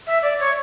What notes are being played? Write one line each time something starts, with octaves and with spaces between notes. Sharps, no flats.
E5
D5
C#5